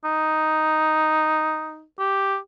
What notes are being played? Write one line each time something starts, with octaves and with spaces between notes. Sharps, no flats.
D#4
G4